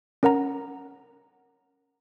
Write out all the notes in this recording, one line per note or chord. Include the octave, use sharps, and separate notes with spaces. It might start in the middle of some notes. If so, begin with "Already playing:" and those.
C#4 A#4 F#5 A#5